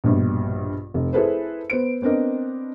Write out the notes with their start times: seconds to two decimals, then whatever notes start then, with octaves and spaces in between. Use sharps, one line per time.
0.04 A#1 G2 B2
0.94 F1
1.13 E4 G#4 A4 B4 C5
1.70 B3 C5 D7
2.02 B3 C4 D4 A#4 D#5